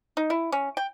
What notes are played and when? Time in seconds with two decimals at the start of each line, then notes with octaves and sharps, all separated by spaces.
0.17 D#4
0.30 E4
0.52 C#4
0.77 G5